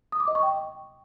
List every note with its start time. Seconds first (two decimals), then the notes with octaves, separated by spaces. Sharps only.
0.12 D#6
0.20 D6
0.28 D#5
0.35 C#6
0.43 G5